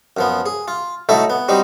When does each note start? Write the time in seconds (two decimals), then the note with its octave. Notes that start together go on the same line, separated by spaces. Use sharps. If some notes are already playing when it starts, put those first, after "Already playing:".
0.17 F#2 F3 B3
0.46 G#4
0.68 F4
1.09 F#3 A3 D#4 E4 A4 E5
1.30 B3
1.48 F#3 G3 C4 D#4